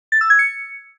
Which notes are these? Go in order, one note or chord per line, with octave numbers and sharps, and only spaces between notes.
A6
E6
G#6
C#7